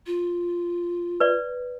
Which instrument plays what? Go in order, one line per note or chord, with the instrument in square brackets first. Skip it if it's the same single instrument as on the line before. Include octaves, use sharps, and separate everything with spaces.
[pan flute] F4
[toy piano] B4 D5